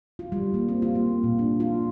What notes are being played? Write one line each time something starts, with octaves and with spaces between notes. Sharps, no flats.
F4
G3
A#3
C4
F4
A#3
A#2
D4
F4